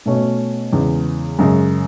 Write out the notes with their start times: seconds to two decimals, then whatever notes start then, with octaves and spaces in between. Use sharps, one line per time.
0.06 B2 A3 C#4 F#4
0.73 E2 C#3 G#3
1.39 F#2 C#3 G#3